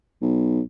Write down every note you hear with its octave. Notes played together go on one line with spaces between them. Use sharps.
B1